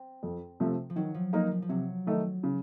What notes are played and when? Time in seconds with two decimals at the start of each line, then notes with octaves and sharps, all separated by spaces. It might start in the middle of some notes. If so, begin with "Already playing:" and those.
Already playing: C4
0.23 F2
0.60 C3 F3 A3
0.90 F3
0.96 D#3 F#3
1.14 F3
1.33 F3 A#3 D#4 A#4
1.51 F3
1.62 F3
1.69 C3 F#3
2.07 D#3 A3 D#4
2.43 C#3